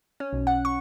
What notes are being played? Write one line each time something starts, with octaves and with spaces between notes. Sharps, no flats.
C#4
B1
F#5
C#6